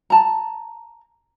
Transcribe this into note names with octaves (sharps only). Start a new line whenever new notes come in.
A5 A#5